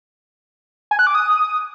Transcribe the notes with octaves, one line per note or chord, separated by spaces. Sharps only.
G#5
F#6
D6
D#6